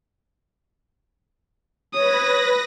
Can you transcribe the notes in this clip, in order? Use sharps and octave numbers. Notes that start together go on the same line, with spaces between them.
B4 C#5 D#6 A#6